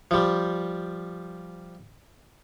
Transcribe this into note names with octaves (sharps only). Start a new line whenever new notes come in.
F3 G3